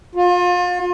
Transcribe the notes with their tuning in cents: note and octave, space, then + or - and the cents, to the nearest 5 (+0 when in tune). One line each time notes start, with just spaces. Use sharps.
F4 +35